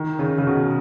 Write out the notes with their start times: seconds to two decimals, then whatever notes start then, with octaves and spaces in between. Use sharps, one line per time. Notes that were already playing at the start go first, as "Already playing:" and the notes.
Already playing: D#3
0.19 C#3
0.38 C#3
0.47 B2